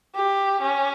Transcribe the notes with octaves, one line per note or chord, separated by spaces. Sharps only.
G4
C#4